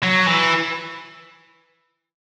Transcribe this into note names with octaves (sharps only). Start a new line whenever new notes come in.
F#3
E3